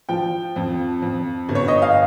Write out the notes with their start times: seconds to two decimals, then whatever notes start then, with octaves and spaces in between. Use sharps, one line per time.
0.09 F3 G5
0.56 F2
1.02 F2
1.49 G1
1.55 C#5
1.68 D#5
1.82 F5